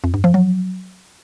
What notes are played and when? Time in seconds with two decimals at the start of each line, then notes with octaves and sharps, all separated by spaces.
0.04 F2
0.14 G2
0.24 F3
0.34 F#3